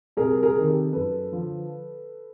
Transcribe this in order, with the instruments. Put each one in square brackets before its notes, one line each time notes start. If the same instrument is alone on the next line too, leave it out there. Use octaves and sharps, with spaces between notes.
[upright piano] C2 G#4 A#4
G#4 A#4
C3 D#3
G4 A4
F#2 A4 B4
D3 F3